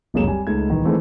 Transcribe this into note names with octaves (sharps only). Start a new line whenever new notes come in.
F1 C#2 F#2 A#3 G#4 E7
G3 G#5
C#2 A3 D#4 G#6
D#1 D#3 E3
D#3 E3 G#3 A3 C4 E4